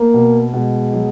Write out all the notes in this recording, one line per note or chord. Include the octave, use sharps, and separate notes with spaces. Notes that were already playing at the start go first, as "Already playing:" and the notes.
Already playing: A3 A#3
B2
B2 G#3
F#3